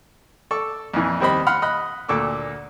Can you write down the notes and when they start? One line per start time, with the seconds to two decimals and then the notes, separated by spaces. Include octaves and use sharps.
0.51 A4 D5 C#6
0.94 F2 A#2 E3
1.20 D#2 G3 C4 D#5 B5
1.47 F5 F#5 B5 C6 F6
1.62 D#5 B5 F#6
2.09 D2 A#2 A4 C#6 D6